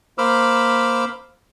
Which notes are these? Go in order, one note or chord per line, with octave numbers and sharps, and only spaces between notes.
A#3 C5 B5 D6 E6 F6